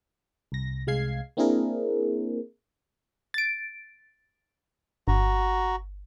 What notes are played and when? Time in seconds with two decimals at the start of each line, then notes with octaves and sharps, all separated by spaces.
0.52 C2 A#6
0.87 C2 G#3 F5 G#6 C7
1.37 A#3 C4 D4 E4 G#4 A#4
3.34 A6 D7
5.08 G1 F#4 A#5